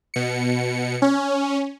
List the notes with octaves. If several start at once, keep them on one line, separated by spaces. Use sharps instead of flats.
B2 C#7
C#4